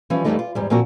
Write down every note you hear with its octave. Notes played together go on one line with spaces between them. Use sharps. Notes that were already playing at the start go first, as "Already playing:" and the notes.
E3 F3 G3 C#4
F2 A#2 E3 G3 A3 D#4
F4
E2 G#2 G3
A#2 F3 A#3 C4 F4 F#4